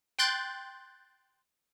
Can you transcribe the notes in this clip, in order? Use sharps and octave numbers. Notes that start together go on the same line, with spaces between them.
G5 C6 F#6 G6 A6